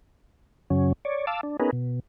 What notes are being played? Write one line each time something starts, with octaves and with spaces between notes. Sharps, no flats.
F#2 C#3 F#3 C#4
C#5 D5
F5 A5 D6 E6
D4
B3 C#4 D#4 G#4 A#4 B4
B2